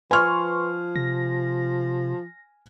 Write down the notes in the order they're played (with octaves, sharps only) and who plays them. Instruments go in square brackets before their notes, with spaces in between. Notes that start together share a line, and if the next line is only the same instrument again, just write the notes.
[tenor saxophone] F3 [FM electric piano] B4 C6 C#6 [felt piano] G#5 F6
[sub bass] C3 [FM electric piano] A#6